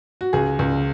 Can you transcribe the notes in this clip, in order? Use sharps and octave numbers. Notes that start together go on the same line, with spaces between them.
F#4
C#2 G#4
C#2